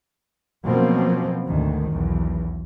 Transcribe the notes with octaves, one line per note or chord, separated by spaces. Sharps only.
B2 F3 F#3 A#3 C4 C#4
D2 G#2 D#3
B1 E2